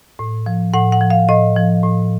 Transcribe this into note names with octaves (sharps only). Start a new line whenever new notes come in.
A2
F3
A2 F#5
F#5
F3
F5
A2 D#5
F3
A2